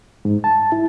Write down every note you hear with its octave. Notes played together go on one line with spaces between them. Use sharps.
G#2
A5
E4